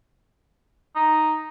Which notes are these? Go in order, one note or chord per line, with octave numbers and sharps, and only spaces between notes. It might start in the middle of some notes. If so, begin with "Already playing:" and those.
D#4